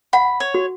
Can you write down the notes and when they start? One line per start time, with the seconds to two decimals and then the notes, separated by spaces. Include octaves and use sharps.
0.13 F#5 B5
0.40 C#5
0.54 F#4